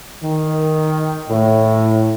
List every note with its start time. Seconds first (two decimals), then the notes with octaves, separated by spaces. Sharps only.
0.23 D#3
1.28 A2